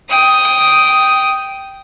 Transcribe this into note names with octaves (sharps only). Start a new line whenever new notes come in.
G5 D#6